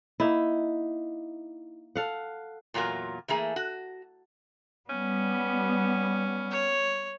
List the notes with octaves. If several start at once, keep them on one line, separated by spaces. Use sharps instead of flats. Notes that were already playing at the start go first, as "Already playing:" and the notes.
A#3 D#4 E4
A4 F5 F#5
E2 A#2 F#3 F4 A#4
E3 A3 A#3 G#4
F#4
G3 B3 C#4
C#5